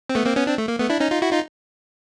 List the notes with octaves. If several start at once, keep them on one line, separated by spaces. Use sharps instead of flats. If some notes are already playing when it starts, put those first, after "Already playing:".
C4
A3 B3
A#3 C4
B3 C#4
C4 D4
A3
A#3
A3 B3
D4 E4
C#4 D#4
D#4 F4
E4 F#4
D#4 F4